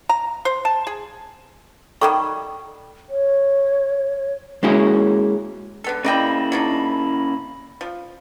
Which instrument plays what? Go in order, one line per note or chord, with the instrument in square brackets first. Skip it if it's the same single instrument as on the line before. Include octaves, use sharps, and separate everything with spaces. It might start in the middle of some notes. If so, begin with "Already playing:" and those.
[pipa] A#5
C5
A5
G#4
[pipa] D#3 F#3 G3 [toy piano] A4 C#6
[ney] C#5
[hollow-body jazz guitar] G#3 A#3 C#4 E4 F#4 G#4
[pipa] D3 B3 A4
[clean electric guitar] C#3 A#3 E4 [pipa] D5 D#5 G5
[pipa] F#3 D4 D#4
F3